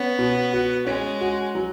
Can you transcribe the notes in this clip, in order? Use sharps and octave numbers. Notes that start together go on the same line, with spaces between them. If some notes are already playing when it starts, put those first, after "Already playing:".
Already playing: B3 C#4
B2
F#4
G#3 C#4
F#4
F#3